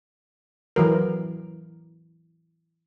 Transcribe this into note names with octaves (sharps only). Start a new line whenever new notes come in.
E3 F#3 A#4